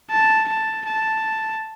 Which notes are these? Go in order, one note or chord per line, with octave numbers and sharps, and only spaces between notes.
A5
A5
A5